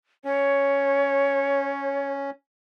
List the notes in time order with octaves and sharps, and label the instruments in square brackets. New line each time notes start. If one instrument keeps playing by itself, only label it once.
[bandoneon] C#4 [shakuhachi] C#5